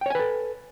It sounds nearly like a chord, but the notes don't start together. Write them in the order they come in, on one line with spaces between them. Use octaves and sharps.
G5 C#5 G#5 B4 A4